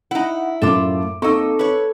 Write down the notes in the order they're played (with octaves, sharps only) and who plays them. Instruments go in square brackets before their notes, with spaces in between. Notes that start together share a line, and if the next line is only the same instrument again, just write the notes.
[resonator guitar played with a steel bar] D#4 F#5 [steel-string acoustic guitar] E4
[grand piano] F#2 A2 D6 [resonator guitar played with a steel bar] F4 A4
[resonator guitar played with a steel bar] A#3 D#5 [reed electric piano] C4 D#4 [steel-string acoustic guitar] A4 [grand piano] C#6 E6
[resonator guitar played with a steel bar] B4 C#5